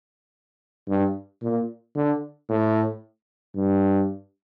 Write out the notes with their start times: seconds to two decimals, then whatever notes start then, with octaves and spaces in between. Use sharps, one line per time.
0.88 G2
1.42 A#2
1.96 D3
2.49 A2
3.56 G2